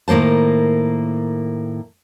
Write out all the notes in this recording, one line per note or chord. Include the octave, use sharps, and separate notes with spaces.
A2 D#3 A#3 C5 A5